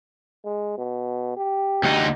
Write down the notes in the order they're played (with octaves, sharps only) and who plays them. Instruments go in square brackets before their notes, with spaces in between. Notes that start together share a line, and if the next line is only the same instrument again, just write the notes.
[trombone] G#3
B2
G4
[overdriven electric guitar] D2 D#4